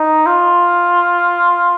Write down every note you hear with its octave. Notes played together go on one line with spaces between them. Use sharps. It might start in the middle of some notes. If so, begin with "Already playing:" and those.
Already playing: D#4
F4